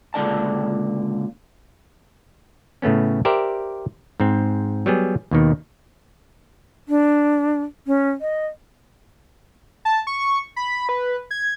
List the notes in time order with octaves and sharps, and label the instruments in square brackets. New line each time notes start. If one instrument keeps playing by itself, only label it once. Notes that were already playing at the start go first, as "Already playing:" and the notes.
[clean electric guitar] C#2 A#2 D3 D5 A5
[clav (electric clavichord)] A2 C#3 A3 B3 C#4
G4 A#4 C5 D5 E5
G#2 C4
F#3 G3 B3 G#4
D#2 B2 D#3
[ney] D4
C#4
D#5
[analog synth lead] A5
C#6
B5
B4
G#6